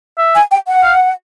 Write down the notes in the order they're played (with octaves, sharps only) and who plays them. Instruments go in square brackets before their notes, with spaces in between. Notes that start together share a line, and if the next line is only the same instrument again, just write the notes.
[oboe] E5
[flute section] G#5
G5
F#5
[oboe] F5